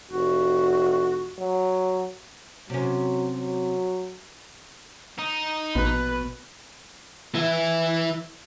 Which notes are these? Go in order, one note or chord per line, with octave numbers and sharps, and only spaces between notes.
F1 F#4
F#3
C3 F#3 C#4
F#3
D#4
A#1 B2 B4
E3 E4